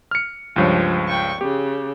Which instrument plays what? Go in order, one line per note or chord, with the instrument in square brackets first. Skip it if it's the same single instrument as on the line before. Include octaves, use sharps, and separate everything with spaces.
[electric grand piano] F6 C#7
[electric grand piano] C#2 G2 C#5 [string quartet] F3
[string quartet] G5 C#6
[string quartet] C#3 [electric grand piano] G4